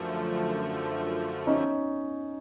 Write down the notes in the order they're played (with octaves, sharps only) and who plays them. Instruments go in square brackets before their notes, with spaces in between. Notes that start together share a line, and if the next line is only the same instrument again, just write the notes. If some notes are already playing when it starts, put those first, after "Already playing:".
Already playing: [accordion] F#2 D3 F3 A3
[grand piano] C#4 D#4